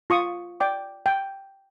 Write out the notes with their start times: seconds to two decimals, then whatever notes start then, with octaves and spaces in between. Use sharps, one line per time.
0.10 F4 C#6 D#6
0.60 D5 G5 D6
1.06 G5